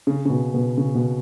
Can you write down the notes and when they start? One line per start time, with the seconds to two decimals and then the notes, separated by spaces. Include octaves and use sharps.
0.07 C#3
0.26 C#3
0.30 B2
0.54 B2
0.78 C#3
0.95 B2